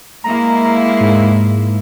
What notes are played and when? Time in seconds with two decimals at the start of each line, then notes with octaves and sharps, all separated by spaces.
0.24 G#3 A#3 E4 A#5
1.00 G#2